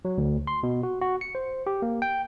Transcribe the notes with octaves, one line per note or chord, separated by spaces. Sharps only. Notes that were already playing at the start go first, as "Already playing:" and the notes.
F#3
D2
C6
B2
F#4
F#4
C#7
C5
G4
A#3
G5